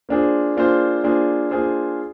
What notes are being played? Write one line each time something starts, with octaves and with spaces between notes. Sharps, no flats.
A#3 D4 F4 G#4 C5
A#3 D4 F4 G#4 C5
A#3 D4 F4 G#4 C5
A#3 D4 F4 G#4 C5